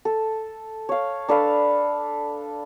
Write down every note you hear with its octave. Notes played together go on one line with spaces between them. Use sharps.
A4
C#5 F5
D4 A4 B4 F5